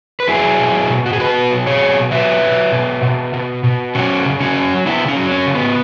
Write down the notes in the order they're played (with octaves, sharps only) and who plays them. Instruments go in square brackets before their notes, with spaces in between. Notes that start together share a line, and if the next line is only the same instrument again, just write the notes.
[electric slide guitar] B4
F#3 E4 G#4
B2
B2
F#4
G#4
B2 F#4 B4
F#3
G#4 C#5
B2
F#3 B4 E5
F#3
B2
B2
B2
B2
F#3 C#4 F#4
C#3
C#4 F#4
F#3
C#3 B3 E4
C#4
F#3
C#4
C#3
B3